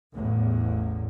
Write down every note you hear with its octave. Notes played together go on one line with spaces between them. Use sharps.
A1 E2